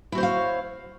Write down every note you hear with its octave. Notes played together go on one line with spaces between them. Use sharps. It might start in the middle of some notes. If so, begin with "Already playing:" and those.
E4 F#4 C5 C#5 F5